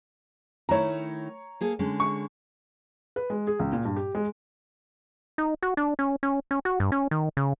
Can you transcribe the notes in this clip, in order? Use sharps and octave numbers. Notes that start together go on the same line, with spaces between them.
D#3 A3 E4 C#5 A#5
A#3 G#4 A4
D3 G#3 C#4
C#6
B4
G#3
G#4
C#2
A#2
G2
G4
G#3
D#4
F#4
D4
C#4
C#4
C#4
F#4
G2
C#4
D#3
C#3